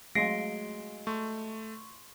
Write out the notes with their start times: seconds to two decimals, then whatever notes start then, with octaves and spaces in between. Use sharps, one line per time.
0.15 F#3 G#3 A3 F5 C6 A#6 C7 D7
1.07 A3 C6 C#6